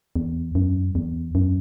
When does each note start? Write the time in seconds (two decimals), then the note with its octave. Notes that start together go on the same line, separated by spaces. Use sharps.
0.16 E2
0.55 F#2
0.95 E2
1.35 F#2